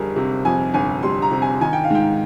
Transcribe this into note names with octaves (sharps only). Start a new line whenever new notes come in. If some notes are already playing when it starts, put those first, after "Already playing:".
Already playing: G1 F2 G3 G#4 A#4
C3
F2 G#5
G1 G#5
G3 C6
A#5
C3
G#5
D#3 G#5
G5
F5
G#2 G5